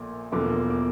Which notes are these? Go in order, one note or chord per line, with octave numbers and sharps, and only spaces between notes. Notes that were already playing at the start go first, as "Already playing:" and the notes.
Already playing: A#1 A#2 A3
E1 E2 D3 F3 A#3 D6
D6